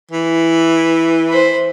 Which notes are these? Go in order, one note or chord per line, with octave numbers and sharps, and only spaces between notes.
E3
C5 B5